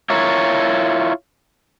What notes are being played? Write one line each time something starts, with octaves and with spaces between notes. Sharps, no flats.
E4 F4 A#4 C#5